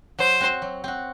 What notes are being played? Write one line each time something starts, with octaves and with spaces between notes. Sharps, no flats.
F#3 C5
C4 F#4
F#3
C4 F#4